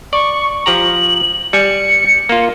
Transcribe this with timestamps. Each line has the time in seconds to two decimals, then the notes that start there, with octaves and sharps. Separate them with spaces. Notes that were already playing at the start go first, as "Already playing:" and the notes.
0.13 D5 C#6
0.66 F3 G4 A#5 F#7
1.53 G3 G#5 C#7
2.29 A#3 F4